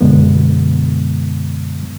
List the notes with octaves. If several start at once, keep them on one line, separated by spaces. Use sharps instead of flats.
F#2 B2 D3 G#3 B3